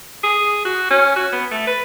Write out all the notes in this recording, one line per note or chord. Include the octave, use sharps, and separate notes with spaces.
G#4
F#4
C#4
F#4
B3
A3
B4